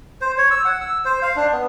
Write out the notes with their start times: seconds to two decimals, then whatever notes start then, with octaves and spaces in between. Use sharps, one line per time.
0.21 C5
0.38 C#5
0.51 E6
0.65 F#5
0.81 E6
1.05 C5
1.22 F5
1.36 D4
1.52 B3